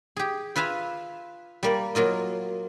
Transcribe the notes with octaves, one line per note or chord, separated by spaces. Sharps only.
G4 G#4
F4 B4 E5 F5 G#5
G3 A#3 D5
F#3 A#3 F4 D#5